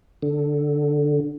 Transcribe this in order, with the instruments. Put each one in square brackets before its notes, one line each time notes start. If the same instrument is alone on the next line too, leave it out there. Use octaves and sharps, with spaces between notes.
[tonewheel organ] D3